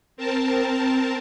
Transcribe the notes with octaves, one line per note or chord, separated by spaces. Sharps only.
C4 A#4 A5